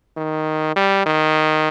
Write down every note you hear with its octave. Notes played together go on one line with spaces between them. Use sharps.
D#3
G3
D#3